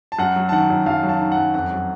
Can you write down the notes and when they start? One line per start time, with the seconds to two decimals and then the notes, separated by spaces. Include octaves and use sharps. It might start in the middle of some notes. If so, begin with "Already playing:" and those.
0.12 A5
0.19 F#2 F#5
0.36 F#3
0.49 A5
0.52 D#3 F#5
0.70 F#2
0.86 F#2 F5 A5
1.03 F#3
1.09 F5 A5
1.20 D#3
1.32 F#5
1.37 F#2
1.54 F2 F#5
1.71 F#3